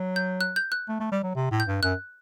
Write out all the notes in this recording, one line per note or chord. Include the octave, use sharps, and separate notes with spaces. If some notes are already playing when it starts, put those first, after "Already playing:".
Already playing: F#3
G6
F#6
G6
F#6
A3
A3
G3
F#3
C3
A2
G6
G2
F#2 F#6